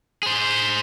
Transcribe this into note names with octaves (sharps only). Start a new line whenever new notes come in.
G#4 C5